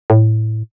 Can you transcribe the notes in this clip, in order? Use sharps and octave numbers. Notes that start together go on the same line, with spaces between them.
A2